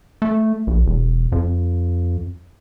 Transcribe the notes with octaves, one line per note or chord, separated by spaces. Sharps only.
A3
A#1
E1
F2